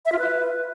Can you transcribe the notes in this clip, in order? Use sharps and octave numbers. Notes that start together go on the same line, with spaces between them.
E5
F4
B4